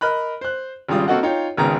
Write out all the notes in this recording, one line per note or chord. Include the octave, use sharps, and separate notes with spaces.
A#4 D#5 B5 F#6
C5 F#6
G#1 C#3 G3 F4 D#6
A#3 C4 F#4 A4 D#5 F#5
D#4 F4 C#5 G5
G#1 C#2 D#3 G#3 B3 A#5